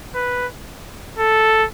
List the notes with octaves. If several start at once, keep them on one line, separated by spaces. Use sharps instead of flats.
B4
A4